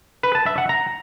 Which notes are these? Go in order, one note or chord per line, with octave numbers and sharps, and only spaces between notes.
B4
A5
E5
F#5
A#5